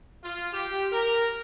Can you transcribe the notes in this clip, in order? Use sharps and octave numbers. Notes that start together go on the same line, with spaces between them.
F4
G4
A#4